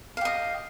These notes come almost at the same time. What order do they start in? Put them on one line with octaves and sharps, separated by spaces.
F5 G4 D#5